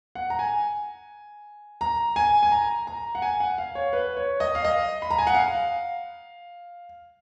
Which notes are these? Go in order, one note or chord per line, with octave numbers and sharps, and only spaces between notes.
F#5
A#5
G#5
A#5
G#5
G#5
A#5
A#5
F#5
G#5
F#5
F5
C#5
B4
C#5
D#5
F5
D#5
B5
A#5
G#5
F#5
F5